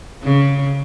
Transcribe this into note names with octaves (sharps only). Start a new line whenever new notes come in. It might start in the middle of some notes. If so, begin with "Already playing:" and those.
C#3